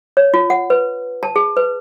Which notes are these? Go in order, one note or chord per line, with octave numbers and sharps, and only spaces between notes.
C#5
F4
F#5
B4
A5
G#4
B4